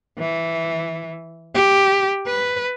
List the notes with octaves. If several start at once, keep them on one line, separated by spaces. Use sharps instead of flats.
E3
G4
B4